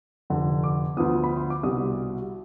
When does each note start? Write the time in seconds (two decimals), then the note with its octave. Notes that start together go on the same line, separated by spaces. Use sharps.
0.30 F1 F2 D3
0.64 D6
0.97 D2 D3 F3 B3 D#6
1.24 B5
1.37 C6
1.50 D6
1.63 C2 B2 G3 D#6